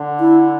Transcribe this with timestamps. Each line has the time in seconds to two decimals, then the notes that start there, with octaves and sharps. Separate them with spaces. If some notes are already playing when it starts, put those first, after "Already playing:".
Already playing: D3
0.20 E4